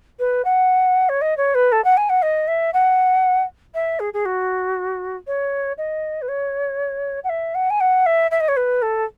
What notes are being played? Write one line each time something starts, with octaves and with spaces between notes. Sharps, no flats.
B4
F#5
C#5
D#5
C#5
B4
A4
F#5
G#5
F#5
D#5
E5
F#5
E5
G#4
G#4
F#4
C#5
D#5
B4
C#5
F#5
E5
F#5
G#5
F#5
E5
E5
D#5
C#5
B4
A4